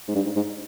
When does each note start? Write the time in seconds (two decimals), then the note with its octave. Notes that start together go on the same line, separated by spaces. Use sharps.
0.08 G#2
0.15 G2
0.26 G#2
0.36 G#2